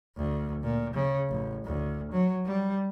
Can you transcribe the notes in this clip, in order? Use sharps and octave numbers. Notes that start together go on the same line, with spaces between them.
D2
A#2
C#3
A1
D2
F#3
G3